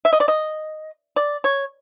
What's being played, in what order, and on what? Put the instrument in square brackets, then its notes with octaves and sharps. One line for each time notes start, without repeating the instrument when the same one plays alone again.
[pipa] E5
D#5
D5
D#5
D5
C#5